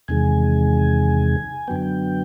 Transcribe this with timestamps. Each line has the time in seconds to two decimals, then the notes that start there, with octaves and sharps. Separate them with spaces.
0.08 E2 C3 D#3 G#3 G#5
1.68 F#2 D3 F#3 B3 G5